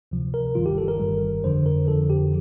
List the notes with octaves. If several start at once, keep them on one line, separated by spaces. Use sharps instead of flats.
D2 C3 F3
A#4
G1 G2 D#3 G3 F4
G4
A4
A#4
G1 G2 D#3 G3
F2 D3 F3 C5
A#4
F2 D3 F3 A4
G4